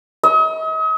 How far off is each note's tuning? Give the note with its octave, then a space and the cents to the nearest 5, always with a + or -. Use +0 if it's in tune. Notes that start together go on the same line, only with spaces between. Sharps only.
D#5 +40